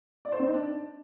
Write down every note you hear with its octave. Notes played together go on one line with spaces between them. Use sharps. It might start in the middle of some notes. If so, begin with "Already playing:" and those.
D5
C5
C4
D#4
D4